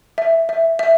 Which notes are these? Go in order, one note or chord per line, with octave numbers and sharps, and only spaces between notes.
E5
E5
E5